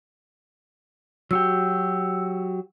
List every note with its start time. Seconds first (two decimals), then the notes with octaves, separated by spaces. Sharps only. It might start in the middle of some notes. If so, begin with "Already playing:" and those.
1.31 F#3 F#4 G4 E6